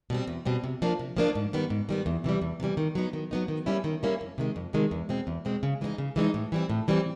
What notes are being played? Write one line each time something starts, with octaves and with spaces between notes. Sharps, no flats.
B2 G3 C4
E2
B2 G3 C4
C3
F3 A#3 D4 F4
C3
F3 A#3 D4 F4
G#2
D#3 G3 B3
G#2
D#3 G3 B3
E2
C3 E3 G3
E2
C3 E3 G3
D#3
F#3 B3 D#4
D#3
F#3 B3 D#4
D#3
G3 A#3 C#4 E4
D#3
G3 A#3 C#4 E4
F2
C3 D#3 G#3
F2
C3 D#3 G#3
E2
B2 G#3 C4
E2
B2 G#3 C4
C#3
E3 G#3 C4 D#4
C#3
E3 G#3 C4 D#4
A2
E3 G3 C4
A2
E3 G3 C4